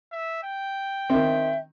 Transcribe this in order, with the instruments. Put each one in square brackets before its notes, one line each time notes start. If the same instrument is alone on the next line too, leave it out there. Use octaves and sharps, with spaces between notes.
[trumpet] E5
G5
[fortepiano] D#3 C4 [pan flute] E5